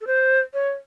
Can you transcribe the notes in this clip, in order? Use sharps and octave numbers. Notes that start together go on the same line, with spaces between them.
A4
C5
C#5